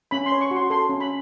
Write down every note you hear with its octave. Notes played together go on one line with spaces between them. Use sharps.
C#4 B5
C6
C#5
C#6
F#4 C6
A4 C6
C#4
B5